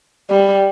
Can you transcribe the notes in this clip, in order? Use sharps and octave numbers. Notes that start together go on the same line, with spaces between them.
G3